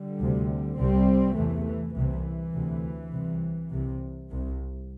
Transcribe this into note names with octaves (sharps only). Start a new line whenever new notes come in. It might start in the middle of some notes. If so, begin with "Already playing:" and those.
Already playing: D3 G3
D2 C3
C2 C3 G3 C4
E2 C3 E3 A3
E3
C2 C3 E3
D2 C3
C2 C3
C2 C3
C2 C3